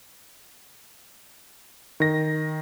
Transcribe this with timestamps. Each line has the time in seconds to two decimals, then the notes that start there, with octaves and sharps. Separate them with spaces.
2.00 D#3 A#6